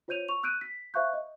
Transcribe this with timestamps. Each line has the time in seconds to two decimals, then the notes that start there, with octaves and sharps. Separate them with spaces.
0.08 F4 C5 C#5 G6 D#7 F7
0.28 C#6 F7
0.43 E6 F#6 G6 D7 D#7
0.61 B6
0.94 C5 E5 F5 C#6 F#6 G6
1.13 D#5